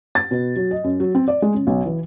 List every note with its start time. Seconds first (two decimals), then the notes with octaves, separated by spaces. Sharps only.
0.15 A6
0.31 B2
0.56 F#3
0.71 D#5
0.84 F#2
1.00 F#3
1.15 C4
1.28 D5
1.42 G#3
1.54 C#3
1.67 B1
1.86 E3